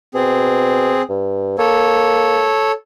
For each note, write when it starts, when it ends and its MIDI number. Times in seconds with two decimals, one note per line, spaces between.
0.15 0.95 47
0.15 1.02 60
0.15 1.02 68
1.09 1.56 43
1.58 2.47 58
1.58 2.72 69
1.58 2.72 73